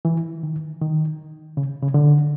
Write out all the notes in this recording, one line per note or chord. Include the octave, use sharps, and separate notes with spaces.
E3
D#3
D#3
C#3
C#3
D3